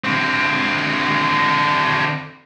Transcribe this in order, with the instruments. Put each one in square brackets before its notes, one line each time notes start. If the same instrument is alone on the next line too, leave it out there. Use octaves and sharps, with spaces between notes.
[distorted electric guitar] D3 C4